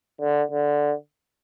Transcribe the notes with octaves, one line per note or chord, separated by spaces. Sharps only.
D3
D3